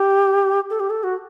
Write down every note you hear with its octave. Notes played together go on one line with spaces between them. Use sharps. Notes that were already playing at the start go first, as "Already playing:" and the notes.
Already playing: G4
A4
G4
A4
F#4